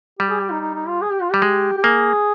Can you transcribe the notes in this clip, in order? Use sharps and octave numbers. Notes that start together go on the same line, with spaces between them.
G3 G4
G#4
G4
D#4
D#4
D#4
F4
G#4
G4
F4
G3 G4
G#3
G4
A#3 G#4